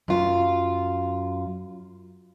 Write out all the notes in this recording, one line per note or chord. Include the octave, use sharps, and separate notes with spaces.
F#2 F4